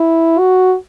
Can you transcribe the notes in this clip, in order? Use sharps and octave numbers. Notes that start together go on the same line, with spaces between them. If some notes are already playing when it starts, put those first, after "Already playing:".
Already playing: E4
F#4